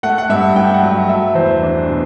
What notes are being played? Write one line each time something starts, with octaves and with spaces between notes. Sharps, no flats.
A3 F#5
F#5
G2 E5
G2 G5
F#5
F#3
E5
A3 E5
E2 C5
D4
B2